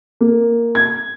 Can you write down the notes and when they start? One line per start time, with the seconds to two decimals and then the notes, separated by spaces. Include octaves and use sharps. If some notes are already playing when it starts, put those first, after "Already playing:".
0.21 A#3
0.75 G#6